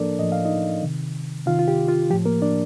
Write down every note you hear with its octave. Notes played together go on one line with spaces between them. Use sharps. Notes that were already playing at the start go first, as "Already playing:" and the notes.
Already playing: A2 F3 A#3 D4 A4 A#4 D5
A2 F3 D#5
F5
D#4 D#5
C3 D#3
C3 D#3 F4 F5
F4
G4
F4
A2 F3 G4
A#3 A#4
D4 D5